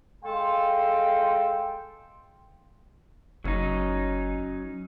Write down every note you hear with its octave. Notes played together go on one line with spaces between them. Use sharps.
G#3 A4 F5 G5 C6
F#1 F#3 C#4 D#4